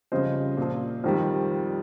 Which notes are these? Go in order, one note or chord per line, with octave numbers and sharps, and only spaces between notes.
F2 C#3 G3 C5 D#5
A#2 F3
F2 D#3 G3